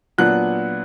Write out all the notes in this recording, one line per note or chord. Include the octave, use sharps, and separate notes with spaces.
A#2 F#3 B3 D4 F#6